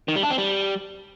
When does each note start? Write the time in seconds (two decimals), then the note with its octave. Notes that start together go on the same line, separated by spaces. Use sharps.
0.08 D#3
0.16 G3
0.23 D4
0.31 C4
0.38 G3